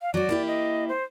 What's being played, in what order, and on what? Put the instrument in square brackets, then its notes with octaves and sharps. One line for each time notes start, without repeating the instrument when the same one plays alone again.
[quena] F5
[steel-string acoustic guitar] F#3 F#4 [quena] D5
[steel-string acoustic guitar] A#3 E4 G4
[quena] D#5
C5